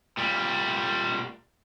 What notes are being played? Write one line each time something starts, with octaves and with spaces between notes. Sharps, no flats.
A#2 G3